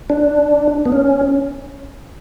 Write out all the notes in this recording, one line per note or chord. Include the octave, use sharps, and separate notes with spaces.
D4
B3
C#4